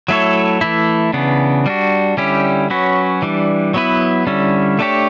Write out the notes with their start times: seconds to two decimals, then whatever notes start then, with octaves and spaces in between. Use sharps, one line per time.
0.08 F#3 A3 E4 A4 C#5
0.61 E3 A3 E4
1.13 C#3 E3 B3 D4
1.66 G3 D4 F#4
2.17 D3 G3 C#4 E4 G4
2.70 F#3 C#4 F#4 B4
3.22 E3 G3 D4
3.74 F#3 B3 E4 B4
4.27 D3 G3 C#4 E4
4.79 A3 D4 G4 C#5